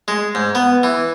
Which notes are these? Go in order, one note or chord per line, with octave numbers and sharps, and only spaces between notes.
G#3
G#2
B3
E3